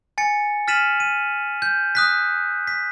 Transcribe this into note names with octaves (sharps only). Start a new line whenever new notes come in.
G#5 A6 C#7
F6 A6 B6 D#7 E7 F#7
D#7
G6
D#6 F#6 B6
B6